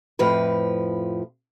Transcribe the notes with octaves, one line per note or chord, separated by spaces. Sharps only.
F2 A2 F3 B4